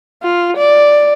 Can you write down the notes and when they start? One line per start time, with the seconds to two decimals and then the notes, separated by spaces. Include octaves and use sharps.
0.23 F4
0.57 D5